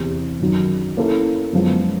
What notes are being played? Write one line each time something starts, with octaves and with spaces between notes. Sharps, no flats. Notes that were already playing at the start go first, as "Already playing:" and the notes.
Already playing: E2 C3 E3
F#2 D#3 F#3
A#3 C#4 E4 A4
F#2 D3 F3 G#3 B3